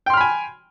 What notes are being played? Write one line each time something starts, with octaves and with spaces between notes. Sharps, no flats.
G5 G#5 B5 C6 F6